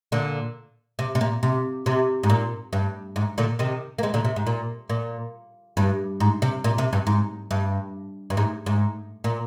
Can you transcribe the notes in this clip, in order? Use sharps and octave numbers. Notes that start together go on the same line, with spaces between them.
A#2 D3
C3
C3
A#2
C3
C3
G#2
A#2
G2
G#2
A#2 D3
C3 D#3
A#3
G#3 C4
A#2 D3
C3
G#2
A#2
A#2
G2
G#2
C3
A#2
C3
G2
G#2
G2
G2
G#2
G#2
A#2